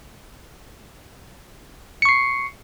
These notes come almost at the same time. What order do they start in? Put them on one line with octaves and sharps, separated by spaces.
C#7 C#6 C7